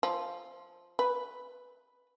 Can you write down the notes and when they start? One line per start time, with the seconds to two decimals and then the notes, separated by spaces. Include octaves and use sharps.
0.03 F3
0.99 B4